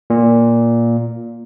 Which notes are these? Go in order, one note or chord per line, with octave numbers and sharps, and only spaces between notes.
A#2